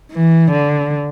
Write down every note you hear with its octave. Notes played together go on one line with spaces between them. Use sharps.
E3
D3